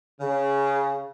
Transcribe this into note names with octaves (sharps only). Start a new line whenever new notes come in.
C#3